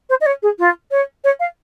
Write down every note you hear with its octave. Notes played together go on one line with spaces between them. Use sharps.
C5
D#5
C#5
G#4
F4
C#5
C#5
F5